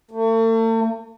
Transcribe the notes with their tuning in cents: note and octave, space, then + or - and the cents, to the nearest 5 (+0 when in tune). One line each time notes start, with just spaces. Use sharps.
A3 +40